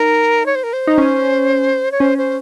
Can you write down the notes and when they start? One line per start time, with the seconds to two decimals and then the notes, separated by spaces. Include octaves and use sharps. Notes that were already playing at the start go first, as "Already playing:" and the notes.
Already playing: D#4 A#4
0.46 C#5
0.55 C5
0.64 A#4
0.73 C5
0.87 D#4
0.98 C#4
1.92 C#5
2.00 C#4 C5
2.18 C5